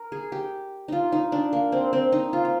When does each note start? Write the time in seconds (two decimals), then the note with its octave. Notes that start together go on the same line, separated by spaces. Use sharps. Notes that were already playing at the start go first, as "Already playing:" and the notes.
Already playing: A#4
0.12 G#4
0.32 G4
0.88 D#4 F4
1.12 D#4
1.32 D4
1.53 A#3
1.72 C4
1.93 C4
2.12 D#4
2.33 F4
2.45 F4